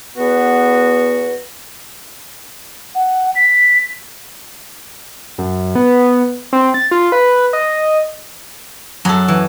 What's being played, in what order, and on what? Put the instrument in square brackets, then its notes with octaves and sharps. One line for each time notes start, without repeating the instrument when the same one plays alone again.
[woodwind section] E2 B3 F#4 B4
[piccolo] F#5
B6
[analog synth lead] F#2
B3
C4
A6
F4
B4
D#5
[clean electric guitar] F#2 [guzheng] F#3 A4
[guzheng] E3